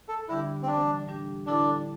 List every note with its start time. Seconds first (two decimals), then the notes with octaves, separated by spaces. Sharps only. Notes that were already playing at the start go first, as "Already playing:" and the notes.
0.08 A4
0.28 D3 G3 D4 E4 G4
0.62 C4
0.67 C3 E3 G3 D4
1.08 A2 G3 D4 G4
1.46 D3 G3 D4 E4 A4